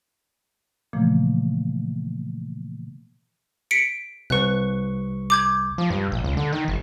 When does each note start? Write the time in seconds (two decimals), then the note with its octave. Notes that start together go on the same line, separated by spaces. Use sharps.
0.93 A#2 C#3 E3 F3 A3 A#3
3.71 B6 C#7 D7
4.30 C2 B4 C#6 F#6
5.30 D6 G6 G#6
5.78 F3
5.90 G2
6.12 A#1
6.24 C#2
6.37 D3
6.53 D#3
6.68 G1